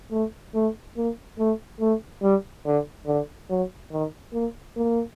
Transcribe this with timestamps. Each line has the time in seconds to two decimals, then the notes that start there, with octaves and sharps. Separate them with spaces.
0.11 A3
0.55 A3
0.96 A#3
1.39 A3
1.81 A3
2.22 G3
2.66 D3
3.07 D3
3.50 F#3
3.92 D#3
4.33 A#3
4.76 A#3